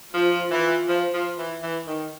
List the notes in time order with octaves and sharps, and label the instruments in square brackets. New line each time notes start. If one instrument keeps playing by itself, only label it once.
[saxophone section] F3 [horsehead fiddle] F4
[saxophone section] E3
F3
F3
E3
E3
D#3